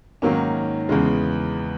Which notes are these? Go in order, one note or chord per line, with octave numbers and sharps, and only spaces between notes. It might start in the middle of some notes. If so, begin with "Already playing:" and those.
G#2 D#3 F#3 A#3 C#4
E2 C#3 G#3